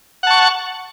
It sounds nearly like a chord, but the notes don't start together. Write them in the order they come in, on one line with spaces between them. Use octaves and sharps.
F#5 A5 C#6